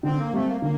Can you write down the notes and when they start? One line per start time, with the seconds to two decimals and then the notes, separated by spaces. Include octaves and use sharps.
0.03 D3 C4
0.18 A#3
0.33 G3 A3 C4
0.47 A#3
0.61 D3 A#3